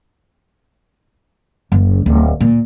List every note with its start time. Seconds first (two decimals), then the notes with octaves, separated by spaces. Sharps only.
1.72 F#1
2.06 D1
2.40 A#2